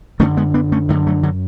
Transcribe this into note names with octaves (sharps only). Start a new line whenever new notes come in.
F#2 D3 A3 C#4
G#3 B3
B3 D4
A3 C#4
F#2 D3 F#3 A3
F#3 A3
D3 F#3